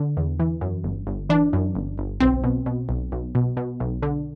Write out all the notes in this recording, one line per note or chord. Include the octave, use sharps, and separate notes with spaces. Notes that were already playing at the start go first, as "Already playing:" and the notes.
Already playing: D3
E2
E3
F#2
G1
G1
E3 D4
F#2
G1
G1
B1 C4
B2
B2
B1
B1
B2
B2
B1
D3